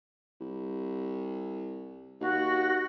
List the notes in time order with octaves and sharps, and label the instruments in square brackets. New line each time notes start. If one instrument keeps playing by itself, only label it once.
[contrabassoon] C2
[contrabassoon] D#2 [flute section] F#4